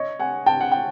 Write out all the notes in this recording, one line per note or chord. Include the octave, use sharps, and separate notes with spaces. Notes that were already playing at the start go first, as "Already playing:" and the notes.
Already playing: C#5 D#5
F#5 G#5
G5 A5
F#5
G5